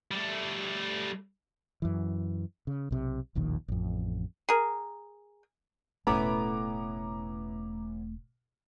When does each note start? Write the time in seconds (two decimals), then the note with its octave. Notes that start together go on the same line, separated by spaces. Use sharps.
0.11 G3 A3
1.82 F#2 E3
2.67 C#3
2.91 B1 C3
3.35 E1 A#1 D#2 D#3
3.68 A1 F2
4.49 G#4 A#4
6.07 E1 A2 A3 B3 C#4 E4 A#5 D6